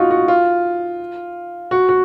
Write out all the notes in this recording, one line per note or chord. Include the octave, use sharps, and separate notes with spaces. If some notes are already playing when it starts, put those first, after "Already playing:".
Already playing: D#4 F4 F#4
F#4
F4
F#4
F#4